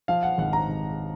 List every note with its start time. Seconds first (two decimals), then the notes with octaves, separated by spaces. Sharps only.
0.08 F3 F5
0.23 F#5
0.38 G#1 F#5
0.53 A#5
0.69 G#1